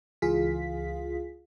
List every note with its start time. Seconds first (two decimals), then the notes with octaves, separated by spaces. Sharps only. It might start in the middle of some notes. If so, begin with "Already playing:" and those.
0.22 C#2 E3 F4 G#4 F5 B6